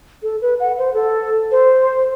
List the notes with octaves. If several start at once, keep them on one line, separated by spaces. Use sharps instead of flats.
A4
B4
F#5
C5
A4
C5